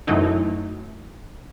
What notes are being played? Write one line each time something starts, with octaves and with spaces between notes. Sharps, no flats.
F#2 E3 F#3 A3 D#4 E4